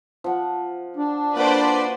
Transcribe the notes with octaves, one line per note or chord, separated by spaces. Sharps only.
F3 F#5
D4
A#3 F#4 B4 C5 D5 F5